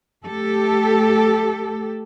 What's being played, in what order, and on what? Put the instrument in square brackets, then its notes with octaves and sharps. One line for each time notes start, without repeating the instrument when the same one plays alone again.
[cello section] A3 G4 A4